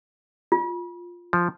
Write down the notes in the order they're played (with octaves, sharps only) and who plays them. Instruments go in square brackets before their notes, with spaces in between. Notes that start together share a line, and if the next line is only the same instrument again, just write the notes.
[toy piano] F4
[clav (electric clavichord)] F3